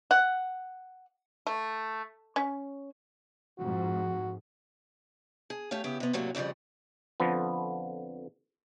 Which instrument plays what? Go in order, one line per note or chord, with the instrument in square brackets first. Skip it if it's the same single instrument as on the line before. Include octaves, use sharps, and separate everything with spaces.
[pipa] F#5
A3
C#4
[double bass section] F2 G#2 [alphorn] F#4
[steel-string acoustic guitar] G#4
A3 G4 C#5 F5
C#3 B3 E4 G4
C3 B3
A2 C3 F#3 G3 A#3 C#4
F2 C#3 E3 F3 G3
[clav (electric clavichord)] F2 D3 F3 B3